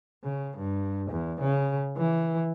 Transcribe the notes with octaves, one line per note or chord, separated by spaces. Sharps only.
C#3
G2
E2
C#3
E3